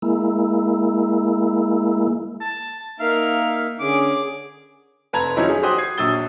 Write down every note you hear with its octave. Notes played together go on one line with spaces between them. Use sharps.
G#3 A#3 E4
A5
A#3 D#4 A#4 E5 F5
D3 C#4 G#4 D6
F1 B4 A5 A#5 G#6 F7
F3 F#3 C#4 D#4 E4
G#4
F#4 G4 C5 D#6 F#6
G#6 C7
A#1 F#3 D#6 E6 A6 G7